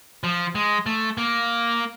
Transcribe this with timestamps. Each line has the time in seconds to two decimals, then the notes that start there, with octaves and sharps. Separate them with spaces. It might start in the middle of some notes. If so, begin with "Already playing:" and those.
0.24 F3
0.55 G#3
0.86 A3
1.18 A#3